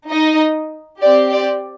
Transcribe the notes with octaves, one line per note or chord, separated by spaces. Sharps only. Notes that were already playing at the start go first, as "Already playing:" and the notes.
D#4 D#5
C4 G4 D5
D5